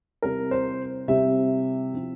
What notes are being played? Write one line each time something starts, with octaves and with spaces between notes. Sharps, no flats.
C3 G3 C4 E4 A#4
C5
C3 G3 C4 E4 E5
F3 C4 E4